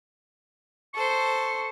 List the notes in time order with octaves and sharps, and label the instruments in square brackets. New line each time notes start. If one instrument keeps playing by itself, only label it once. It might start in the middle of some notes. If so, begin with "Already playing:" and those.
[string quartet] A4 C5 [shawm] C#6